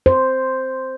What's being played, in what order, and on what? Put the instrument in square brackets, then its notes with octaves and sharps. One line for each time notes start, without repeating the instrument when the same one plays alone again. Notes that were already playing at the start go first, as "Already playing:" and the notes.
[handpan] C5